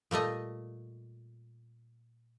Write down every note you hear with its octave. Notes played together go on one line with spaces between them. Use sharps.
A#2 G3 A3 D#5